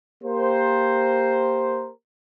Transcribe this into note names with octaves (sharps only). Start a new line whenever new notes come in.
A#3 G4 A#4 C5